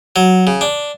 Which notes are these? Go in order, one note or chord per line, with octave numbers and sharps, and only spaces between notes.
F#3
C#3
D4